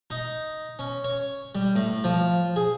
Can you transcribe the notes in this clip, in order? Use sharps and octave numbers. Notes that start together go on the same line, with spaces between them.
D#4
C#4
C#5
G3
A2
F3
G#4